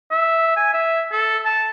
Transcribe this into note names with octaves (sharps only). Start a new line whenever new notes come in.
E5
G#5
E5
A4
A5